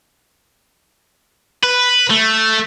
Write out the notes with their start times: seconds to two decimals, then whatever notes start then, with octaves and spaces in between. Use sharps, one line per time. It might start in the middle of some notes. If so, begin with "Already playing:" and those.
1.63 B4
2.10 A3